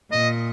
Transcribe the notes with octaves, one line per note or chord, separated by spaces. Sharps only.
A#2 D#5